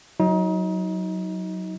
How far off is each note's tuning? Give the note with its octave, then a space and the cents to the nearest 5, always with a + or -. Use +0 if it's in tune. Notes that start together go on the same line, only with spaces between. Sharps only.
F#3 +0 D#4 +30